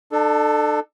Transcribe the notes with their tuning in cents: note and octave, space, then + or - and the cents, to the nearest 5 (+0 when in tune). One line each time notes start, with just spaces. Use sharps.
D4 +40 A4 +0